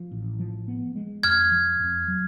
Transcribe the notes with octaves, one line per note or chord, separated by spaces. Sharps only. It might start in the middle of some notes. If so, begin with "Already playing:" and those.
Already playing: F3
A1
F3
B3
G#3
F2 F6 G#6
F3
F2
F#3